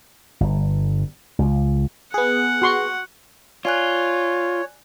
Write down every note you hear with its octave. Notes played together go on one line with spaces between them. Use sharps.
G1
C#2
B3 G#4 F#5
F#4 C6 C#6
F4 C#5 D5 G#5 F#6